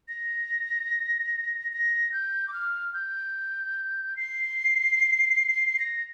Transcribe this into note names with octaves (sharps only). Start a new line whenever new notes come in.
A#6
A#6
G6
D6
F6
G6
C7
A#6